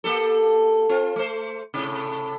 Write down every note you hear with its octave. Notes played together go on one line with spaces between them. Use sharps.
A#3 G4 A4
C4 F4
A3 C5
A2 C3